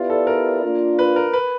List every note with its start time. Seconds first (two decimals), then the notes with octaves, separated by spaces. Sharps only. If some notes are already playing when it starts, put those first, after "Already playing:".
Already playing: B3 E4 F4 G4 B4 D5
0.10 A4
0.27 A#4
0.63 A#3 D4 F4
0.99 B4
1.16 A#4
1.33 B4